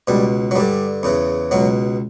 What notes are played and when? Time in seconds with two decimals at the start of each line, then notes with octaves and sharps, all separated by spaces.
0.07 C#2 B2 G3
0.51 F#3
0.55 G2 D3 G3
1.03 E2 C#3 E3
1.51 C#2 B2 F#3